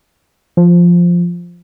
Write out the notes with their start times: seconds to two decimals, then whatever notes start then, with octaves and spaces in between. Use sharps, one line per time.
0.57 F3